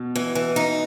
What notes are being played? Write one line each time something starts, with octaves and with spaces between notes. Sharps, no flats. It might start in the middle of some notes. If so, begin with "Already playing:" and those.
Already playing: B2
E3
E3
D#4